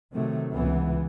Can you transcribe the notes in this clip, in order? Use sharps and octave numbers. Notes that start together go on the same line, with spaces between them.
C3 D#3 F#3 A3
C#2 E3 B3